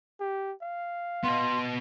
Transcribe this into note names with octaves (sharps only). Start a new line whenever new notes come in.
G4
F5
B3 D#5 C6